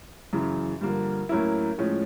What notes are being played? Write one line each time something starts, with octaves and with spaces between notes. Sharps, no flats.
F#2 C#3 E3
G2 D3 F3 A#3
A2 F#3 A#3 C#4 E4
A2 F3 G#3 C#4